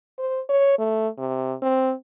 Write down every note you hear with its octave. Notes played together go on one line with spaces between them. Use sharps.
C5
C#5
A3
C3
C4